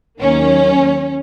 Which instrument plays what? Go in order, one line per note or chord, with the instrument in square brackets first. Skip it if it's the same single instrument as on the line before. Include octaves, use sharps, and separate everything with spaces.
[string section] D#2 D#3 F#3 A#3 C#4